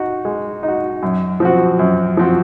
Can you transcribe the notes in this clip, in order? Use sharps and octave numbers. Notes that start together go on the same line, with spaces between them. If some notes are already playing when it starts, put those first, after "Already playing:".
Already playing: D#4 F#4
G#3
D#4
F#4
F#2
F3 C4 F#4
F#2
F3 C4 F#4